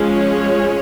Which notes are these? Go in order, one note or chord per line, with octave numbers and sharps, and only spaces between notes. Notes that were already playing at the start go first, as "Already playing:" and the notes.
Already playing: F3 G#3 C#4
C#5